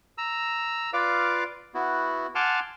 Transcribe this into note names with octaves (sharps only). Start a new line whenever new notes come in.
A#5 E6
F4 B4 D5 F5 D6
B3 E4 F#4
F#5 G#5 A5 C6 D6 F6